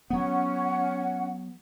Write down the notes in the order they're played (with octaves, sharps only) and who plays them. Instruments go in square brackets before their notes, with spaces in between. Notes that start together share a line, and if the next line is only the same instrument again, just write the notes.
[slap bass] F#3 B3 [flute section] C#4 F#5